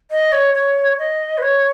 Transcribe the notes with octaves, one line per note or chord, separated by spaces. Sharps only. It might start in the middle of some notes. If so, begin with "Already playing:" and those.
D#5
C#5
C#5
D#5
B4
C#5